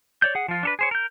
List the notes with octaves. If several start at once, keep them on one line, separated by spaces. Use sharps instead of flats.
C#5 D5 G6
G#4 F#5
F3 F4
D4 A4 B4
G#4 C5 C#5
A#4 G6